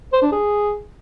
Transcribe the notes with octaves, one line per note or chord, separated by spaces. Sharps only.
C5
D4
G#4